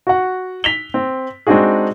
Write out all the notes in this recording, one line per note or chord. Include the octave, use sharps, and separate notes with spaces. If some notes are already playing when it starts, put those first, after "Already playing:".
F#4 F#5
B6 F7 G7
C4
G#3 C4 D4 D#4 F#4 G#4